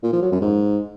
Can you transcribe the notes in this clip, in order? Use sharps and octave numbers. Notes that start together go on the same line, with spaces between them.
A#2
F3
F#3
F#2
G#2